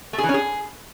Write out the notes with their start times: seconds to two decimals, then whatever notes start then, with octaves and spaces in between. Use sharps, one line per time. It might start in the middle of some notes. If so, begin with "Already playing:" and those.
0.13 A3
0.18 G#4
0.24 E3
0.29 C#4
0.34 G#4